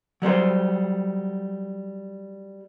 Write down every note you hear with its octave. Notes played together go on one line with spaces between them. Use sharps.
F#3 G3 A3 C5